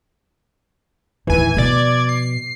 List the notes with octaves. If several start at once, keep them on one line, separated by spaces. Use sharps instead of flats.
D#2 A2 E3 G#5
B2 F3 D5 G#6
C7